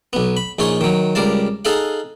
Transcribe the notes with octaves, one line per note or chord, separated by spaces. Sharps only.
B1 B3
B5
A#1 D#4 F4 G#4 C#5
D#3 F#3
C#2 G3 A#4 F5 A5
D#4 G#4 A4 F5 F#5